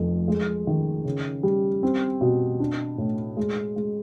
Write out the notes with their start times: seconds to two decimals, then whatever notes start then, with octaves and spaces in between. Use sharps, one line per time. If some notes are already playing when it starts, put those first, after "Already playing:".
Already playing: F1 F2
0.28 G#3
0.67 D#3
1.05 C#3
1.43 G3
1.83 C4
2.21 B2
2.60 D4
2.98 A2
3.37 G#3
3.76 G#3